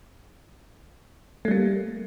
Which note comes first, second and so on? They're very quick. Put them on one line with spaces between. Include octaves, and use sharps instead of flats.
A3 G3 A#3